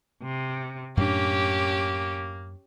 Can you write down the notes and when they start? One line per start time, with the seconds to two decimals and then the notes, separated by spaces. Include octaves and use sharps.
0.22 C3
0.97 F#2 A2 A#3 C#4 D4 G4